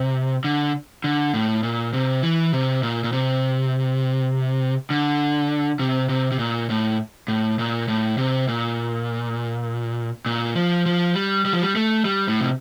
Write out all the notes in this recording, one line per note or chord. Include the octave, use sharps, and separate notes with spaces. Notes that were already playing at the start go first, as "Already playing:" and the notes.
Already playing: C3
D3
D3
A2
A#2
C3
E3
C3
A#2
A#2
C3
D3
C3
C3
C3
A#2
A2
A2
A#2
A2
C3
A#2
A#2
F3
F3
G3
G3
F3
G3
A3
G3
A2
C3